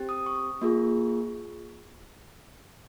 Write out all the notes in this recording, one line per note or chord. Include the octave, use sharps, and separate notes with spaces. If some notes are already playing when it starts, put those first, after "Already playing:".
Already playing: C4 G4
D#6
C#6
A#3 F4 G#4